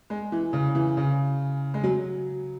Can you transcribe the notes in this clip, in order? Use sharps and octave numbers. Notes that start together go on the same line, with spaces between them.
G#3
E3
C#3
E3
C#3
G#3
F#3